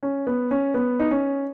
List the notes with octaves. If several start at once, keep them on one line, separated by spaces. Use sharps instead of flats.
C#4
B3
C#4
B3
D#4
C#4